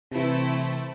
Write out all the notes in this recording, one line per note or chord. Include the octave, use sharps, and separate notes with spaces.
C3 E3 A3 C4 E4